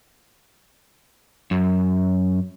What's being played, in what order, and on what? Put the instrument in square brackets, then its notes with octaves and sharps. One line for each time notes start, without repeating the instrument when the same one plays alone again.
[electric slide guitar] F#2